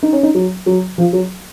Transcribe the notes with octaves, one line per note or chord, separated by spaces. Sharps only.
D#4
C#4
D#4
F#3
F#3
F3
F#3